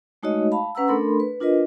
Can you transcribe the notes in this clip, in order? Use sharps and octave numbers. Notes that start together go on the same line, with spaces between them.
G#3 A3 D#4 F#4 C#5 D#5
F5 A5 B5
C#4 B4 F#5 A#5 E6
A3 D4 A4 A#4 B5 C6
B4
D4 F4 A#4 B4 D#5